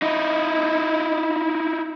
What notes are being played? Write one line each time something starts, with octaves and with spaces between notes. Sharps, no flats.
D#4 E4